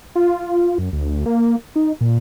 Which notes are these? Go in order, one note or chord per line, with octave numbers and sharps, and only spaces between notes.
F4
F#2
D2
A#3
D#4
A#2